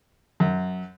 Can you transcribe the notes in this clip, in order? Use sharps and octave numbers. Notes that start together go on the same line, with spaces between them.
F#2